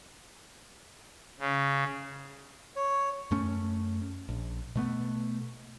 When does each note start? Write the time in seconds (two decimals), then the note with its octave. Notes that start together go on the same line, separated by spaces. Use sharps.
1.40 C#3
2.76 C#5
3.31 F#2 A3 C#4
4.29 A#1
4.75 B2 A3 B3